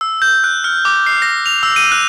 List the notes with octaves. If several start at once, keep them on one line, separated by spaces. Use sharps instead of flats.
E6
G6
F#6
F6
D6
C7
A#6
F7
E6
D#7
F#6